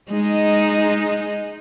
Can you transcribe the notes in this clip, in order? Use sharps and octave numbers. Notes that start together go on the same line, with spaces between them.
G#3 D#4